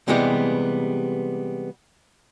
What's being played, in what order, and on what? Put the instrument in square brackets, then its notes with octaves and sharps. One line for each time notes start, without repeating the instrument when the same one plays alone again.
[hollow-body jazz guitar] C3 E3 G3 G#3 B3 G4